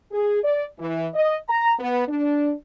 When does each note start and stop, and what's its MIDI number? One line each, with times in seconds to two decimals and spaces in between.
0.12 0.40 68
0.44 0.65 74
0.79 1.08 52
1.14 1.37 75
1.49 1.72 82
1.79 2.03 59
2.08 2.52 62